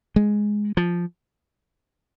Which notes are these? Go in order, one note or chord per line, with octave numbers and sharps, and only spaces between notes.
G#3
F3